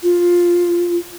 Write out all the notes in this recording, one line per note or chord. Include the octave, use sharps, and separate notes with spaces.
F4